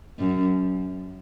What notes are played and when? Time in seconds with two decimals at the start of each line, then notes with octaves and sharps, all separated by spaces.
0.19 F#2